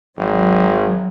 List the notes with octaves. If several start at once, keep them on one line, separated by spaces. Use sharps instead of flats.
G#1 F#3